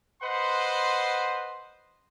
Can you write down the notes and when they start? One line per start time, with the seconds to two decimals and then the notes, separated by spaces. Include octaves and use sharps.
0.22 B4 C5 D#5 F#5 C6